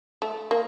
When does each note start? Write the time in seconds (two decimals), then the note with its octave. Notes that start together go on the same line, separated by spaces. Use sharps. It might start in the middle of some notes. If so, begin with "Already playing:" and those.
0.22 A3
0.51 A#3